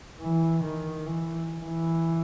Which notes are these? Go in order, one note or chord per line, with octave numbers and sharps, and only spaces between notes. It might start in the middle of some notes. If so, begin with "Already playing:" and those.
E3
D#3
E3
E3